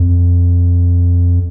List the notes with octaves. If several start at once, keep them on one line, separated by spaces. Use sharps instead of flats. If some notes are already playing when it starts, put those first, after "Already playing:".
Already playing: F2